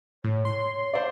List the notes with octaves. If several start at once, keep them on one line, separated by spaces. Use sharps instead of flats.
A2 C#5
C6
C5 D5 F5